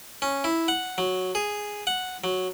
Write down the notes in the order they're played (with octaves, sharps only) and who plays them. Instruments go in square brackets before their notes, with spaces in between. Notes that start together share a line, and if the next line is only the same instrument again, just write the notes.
[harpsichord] C#4
E4
F#5
F#3
G#4
F#5
F#3